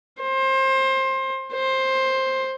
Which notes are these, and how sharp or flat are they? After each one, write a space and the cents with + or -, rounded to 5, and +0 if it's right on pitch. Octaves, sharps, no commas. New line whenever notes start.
C5 +25
C5 +15